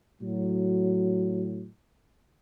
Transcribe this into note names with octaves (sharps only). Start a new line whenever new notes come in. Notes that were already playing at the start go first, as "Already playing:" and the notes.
A2 F#3